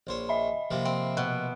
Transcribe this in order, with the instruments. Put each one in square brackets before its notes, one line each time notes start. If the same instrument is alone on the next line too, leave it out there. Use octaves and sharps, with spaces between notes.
[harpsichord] A#1 C5 C#5
[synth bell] D#5 E5 B5
[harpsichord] C3 F3 A#3
[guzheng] C4
B2